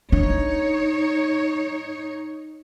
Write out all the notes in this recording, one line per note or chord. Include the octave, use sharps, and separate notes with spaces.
D4 D#4 C#5